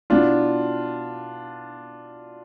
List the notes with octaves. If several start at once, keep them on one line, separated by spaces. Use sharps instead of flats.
B2 B3 D4 E4 F4